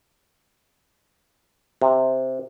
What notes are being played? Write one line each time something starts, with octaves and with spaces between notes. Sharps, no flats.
C3